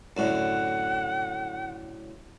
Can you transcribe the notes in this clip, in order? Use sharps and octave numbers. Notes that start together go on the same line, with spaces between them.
F#2 A2 D3 F#5